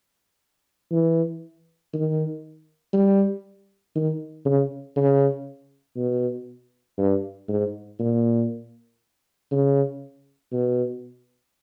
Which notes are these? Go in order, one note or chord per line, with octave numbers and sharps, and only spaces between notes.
E3
D#3
G3
D#3
C#3
C#3
B2
G2
G#2
A#2
C#3
B2